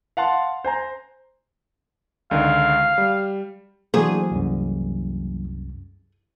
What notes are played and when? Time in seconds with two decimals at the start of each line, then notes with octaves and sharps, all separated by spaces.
0.17 F5 F#5 A5 C6
0.64 C5 G#5 A#5
2.31 C#2 D3 D#3 F5
2.98 G3
3.94 E3 F#3 A#3 D4 F#4 G#4 C5
4.31 C2 F#2